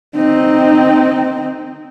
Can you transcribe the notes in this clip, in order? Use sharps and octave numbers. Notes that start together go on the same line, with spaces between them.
C4 D#4